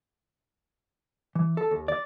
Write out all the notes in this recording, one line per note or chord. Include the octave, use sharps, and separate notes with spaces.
E3
A4
D#2
D5